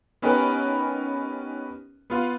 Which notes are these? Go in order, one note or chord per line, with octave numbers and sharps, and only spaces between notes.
B3 C#4 D#4 G4 A#4 B4
B3 F4